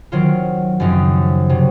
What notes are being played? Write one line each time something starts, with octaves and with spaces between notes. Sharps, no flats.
D#3 F#3 C4 F4
F#2 C#3 F3 C4 D#4
C3 F#3